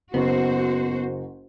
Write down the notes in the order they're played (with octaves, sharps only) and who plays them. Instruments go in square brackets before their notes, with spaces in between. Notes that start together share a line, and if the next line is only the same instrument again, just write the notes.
[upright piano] F#1 [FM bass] B3 [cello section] F#4 C5